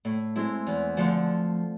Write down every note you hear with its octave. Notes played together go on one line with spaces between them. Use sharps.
A2
G#3 C4 E4
E2
D3 F3 A3